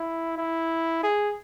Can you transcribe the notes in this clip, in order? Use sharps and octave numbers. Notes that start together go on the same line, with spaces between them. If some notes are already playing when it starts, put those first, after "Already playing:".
Already playing: E4
E4
G#4